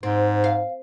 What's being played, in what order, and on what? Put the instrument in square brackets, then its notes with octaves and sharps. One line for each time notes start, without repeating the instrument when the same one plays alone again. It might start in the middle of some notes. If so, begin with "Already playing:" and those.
[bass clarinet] G#2 [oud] C4
[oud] F5